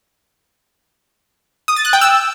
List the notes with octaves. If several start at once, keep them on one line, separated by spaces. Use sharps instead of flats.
D#6
A6
F#6
G5
E6